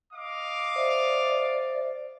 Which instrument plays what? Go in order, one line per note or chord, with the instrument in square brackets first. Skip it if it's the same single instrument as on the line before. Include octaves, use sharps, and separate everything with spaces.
[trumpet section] D#5 F5 D6
[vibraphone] C5 E5 [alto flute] D5